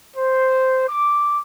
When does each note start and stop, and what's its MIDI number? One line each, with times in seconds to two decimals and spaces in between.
0.16 0.88 72
0.88 1.39 86